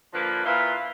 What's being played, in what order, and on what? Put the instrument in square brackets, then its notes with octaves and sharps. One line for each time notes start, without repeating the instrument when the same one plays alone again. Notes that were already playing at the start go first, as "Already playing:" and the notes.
[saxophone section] D3 F3 A#3 B4
A#2 E4 F4 B4 F5